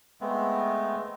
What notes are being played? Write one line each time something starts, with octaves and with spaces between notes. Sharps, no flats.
G#3 A3 B3 C4